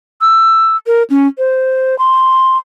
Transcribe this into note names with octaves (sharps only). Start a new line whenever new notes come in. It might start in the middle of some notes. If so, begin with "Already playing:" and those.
E6
A#4
C#4
C5
C6